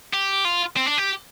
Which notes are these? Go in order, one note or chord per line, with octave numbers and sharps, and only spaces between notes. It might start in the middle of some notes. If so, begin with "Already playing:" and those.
G4
F4
C4
D4
G4